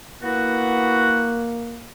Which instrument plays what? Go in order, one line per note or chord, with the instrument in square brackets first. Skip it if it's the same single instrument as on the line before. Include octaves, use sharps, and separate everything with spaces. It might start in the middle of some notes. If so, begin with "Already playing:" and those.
[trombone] A#3 [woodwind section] B3 E4 F#4